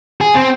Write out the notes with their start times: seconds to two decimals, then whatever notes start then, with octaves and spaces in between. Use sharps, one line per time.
0.21 G#4
0.35 C4